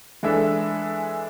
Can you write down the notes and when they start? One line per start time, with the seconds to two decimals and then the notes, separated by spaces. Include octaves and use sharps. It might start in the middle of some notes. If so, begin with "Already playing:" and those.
0.23 E3 G#3 D4 A4 E5